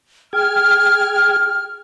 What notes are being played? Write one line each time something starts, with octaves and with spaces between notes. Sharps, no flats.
G#4 G5 F6 G#6